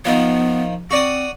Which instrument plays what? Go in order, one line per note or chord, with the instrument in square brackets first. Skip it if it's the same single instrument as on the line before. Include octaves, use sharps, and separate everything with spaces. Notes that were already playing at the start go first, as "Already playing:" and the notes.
[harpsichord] D#3 F3 [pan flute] B3
[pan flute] C4 [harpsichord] F#4 D5 D#6